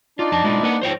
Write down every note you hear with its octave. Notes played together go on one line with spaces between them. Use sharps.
D4 D#4 F4 D5
F2 A5
G#3 E4 F4
A#3 B4 F#5
G#2 F3 C5 C#5 G5